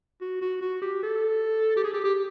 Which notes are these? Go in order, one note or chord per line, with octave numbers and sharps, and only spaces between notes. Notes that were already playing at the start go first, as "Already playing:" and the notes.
F#4
F#4
F#4
G4
A4
G4
G#4
G4
G4